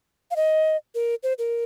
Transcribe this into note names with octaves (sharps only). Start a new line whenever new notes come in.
F5
D#5
A#4
C5
A#4